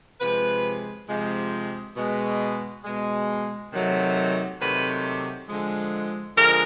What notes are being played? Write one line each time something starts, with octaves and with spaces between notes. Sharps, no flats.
C3 F3 G#3 B4
C3 F3 G#3
B2 G#3
B2 G#3
C3 D#3 F#3 A3
C3 D#3 F#3 A3 B4
D3 F3 G#3
D3 F3 G#3 A#4